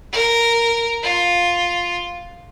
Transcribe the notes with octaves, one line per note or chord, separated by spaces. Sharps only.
A#4
F4